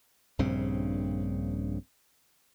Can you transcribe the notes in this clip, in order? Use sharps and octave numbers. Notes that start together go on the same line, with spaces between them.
A#1 G2 C#3 C4